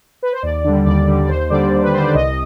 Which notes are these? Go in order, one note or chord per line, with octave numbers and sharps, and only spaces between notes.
B4
C5
D#2 D5
D3 G3
D#2 D5
D3 G3
D5
D#2 C5
D3 G3 D5
D#2
B4
D3 G3 C5
D5
C2 D#5